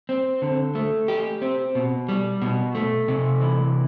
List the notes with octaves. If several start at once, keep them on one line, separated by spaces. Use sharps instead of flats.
C4
D3
A3
G4
C4
B2
G3
B2
A3
C3
E3